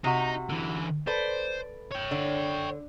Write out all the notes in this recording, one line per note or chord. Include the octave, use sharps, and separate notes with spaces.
C3 D#4 F#4
D3 E3
A4 B4 C5 D5
C#5 G5
D3